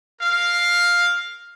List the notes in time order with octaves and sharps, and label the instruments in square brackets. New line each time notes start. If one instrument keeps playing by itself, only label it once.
[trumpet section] A#4 F5